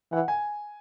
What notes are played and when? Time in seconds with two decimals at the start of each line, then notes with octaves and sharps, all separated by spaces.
0.12 E3 F#5
0.28 G#5